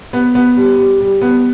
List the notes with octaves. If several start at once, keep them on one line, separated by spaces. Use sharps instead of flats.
B3
B3
G3
G3
G3
B3